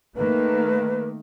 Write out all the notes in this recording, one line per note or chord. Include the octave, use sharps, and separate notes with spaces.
D#3 A3 A#3 B4